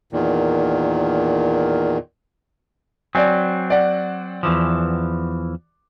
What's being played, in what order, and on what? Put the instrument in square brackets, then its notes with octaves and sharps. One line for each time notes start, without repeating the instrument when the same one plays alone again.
[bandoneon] E2 A#2 D#3
[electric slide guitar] F#3 C4 [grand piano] D5 G#5
[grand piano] D5 F#5
[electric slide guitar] E2 E3 F3